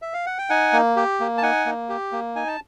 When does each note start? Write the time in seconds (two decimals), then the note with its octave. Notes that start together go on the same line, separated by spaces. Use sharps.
0.02 E5
0.14 F5
0.26 F#5
0.38 G5
0.50 D#4 F#5 G#5
0.73 A#3
0.96 G4
1.20 A#3
1.38 A5
1.42 D#4 F#5 G#5
1.66 A#3
1.89 G4
2.12 A#3
2.35 D#4 G#5
2.48 A5